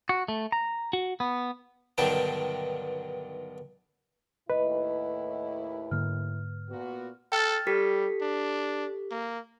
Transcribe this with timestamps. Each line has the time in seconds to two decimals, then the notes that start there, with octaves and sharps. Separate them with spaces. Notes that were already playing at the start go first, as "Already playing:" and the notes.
0.09 F#4
0.28 A3
0.52 A#5
0.93 F#4
1.20 B3
1.98 B1 G2 D3 D#3 G5 A5
4.50 D#2 A2 E4 B4 D#5
5.91 G#2 D3 A#3 F6
6.70 A#2 B3 F#4
7.32 A4 G5 F6 A6
7.67 G3 G4 A4 B6
8.22 D4
9.11 A#3